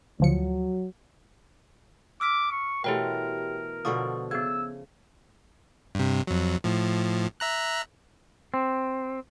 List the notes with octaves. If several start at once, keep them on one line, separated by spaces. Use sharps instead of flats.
D2 F3 F#3 C#7
D6 E6 F6 B6
C#6
B2 E3 A3 G4 A#4 C#5 G5
B2 D3 F3 C#6 D#6
C#3 B3 E6 G#6
G2 C3
F2 F#3
A2 F3
E5 A#5 F#6
C4